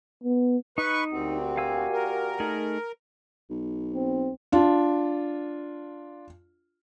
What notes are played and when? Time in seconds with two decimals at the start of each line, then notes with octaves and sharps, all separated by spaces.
0.24 B3
0.78 D#4 B4 D#5 C#6
1.12 D2 A#2 C4 F#4 G4
1.57 F5 G#5 E6
1.93 A#4
2.40 A3 D#4 G#4
3.50 B1
3.94 C4
4.52 D4 F4